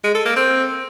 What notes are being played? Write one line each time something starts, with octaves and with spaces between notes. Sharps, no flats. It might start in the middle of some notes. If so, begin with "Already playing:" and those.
G#3
A4
A#3
C4